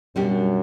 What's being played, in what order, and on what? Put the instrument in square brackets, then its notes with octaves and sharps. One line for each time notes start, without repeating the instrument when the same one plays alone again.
[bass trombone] F#2 [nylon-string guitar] B2 G3 D4 G4